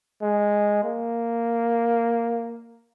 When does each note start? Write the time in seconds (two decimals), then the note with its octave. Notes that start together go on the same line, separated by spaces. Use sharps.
0.22 G#3
0.83 A#3